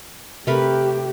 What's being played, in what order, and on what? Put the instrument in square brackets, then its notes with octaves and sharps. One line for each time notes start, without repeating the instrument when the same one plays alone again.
[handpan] C3 [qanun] A3 A#4 B4 [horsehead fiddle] G4